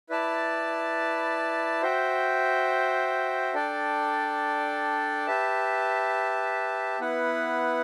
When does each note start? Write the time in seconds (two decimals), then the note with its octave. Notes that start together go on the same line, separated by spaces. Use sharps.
0.10 E4 B4 D5 A5
1.82 F#4 C5 E5 G5
3.54 D4 A4 D5 G5
5.27 G4 B4 E5 A5
7.00 B3 E4 B4 F#5